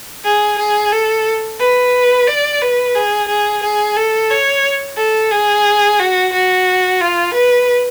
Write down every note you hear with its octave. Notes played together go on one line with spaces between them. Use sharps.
G#4
G#4
A4
B4
D5
B4
G#4
G#4
G#4
A4
C#5
A4
G#4
F#4
F#4
F4
B4